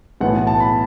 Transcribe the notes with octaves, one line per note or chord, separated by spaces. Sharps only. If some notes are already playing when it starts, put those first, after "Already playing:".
B1 A2 E3 B3 F#5
A5
B5